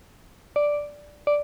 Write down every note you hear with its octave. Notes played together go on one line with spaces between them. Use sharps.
D5
D5